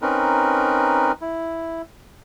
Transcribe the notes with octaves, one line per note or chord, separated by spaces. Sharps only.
C4 C#4 D#4 A#4 B4
E4